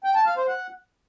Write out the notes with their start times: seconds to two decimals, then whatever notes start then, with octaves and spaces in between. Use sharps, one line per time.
0.04 G5
0.15 A5
0.26 F5
0.37 C5
0.48 F#5